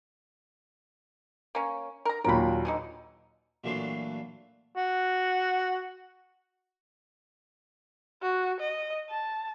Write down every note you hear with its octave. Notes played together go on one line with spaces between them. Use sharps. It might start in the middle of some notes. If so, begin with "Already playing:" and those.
A#3 C#4
A#4 A#5
D#2 A#2 F#3 A#4 B5
D3 E3 D#4
A#2 E3 F#3 A3 D4 C6
F#4
F#4
D#5
A5